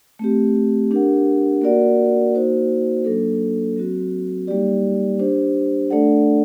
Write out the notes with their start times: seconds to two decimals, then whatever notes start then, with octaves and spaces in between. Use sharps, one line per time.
0.19 A3 C4 G4
0.91 D4 G4 A#4 F#5
1.62 A#3 F#4 A#4 D5 F#5
2.34 A#3 D#4 F#4 C5
3.04 F#3 A#3 D4 A4
3.76 F#3 C4 F#4
4.47 G3 A#3 D#4 G4 D5
5.19 D4 G4 C5
5.90 A3 D4 A4 D5 F#5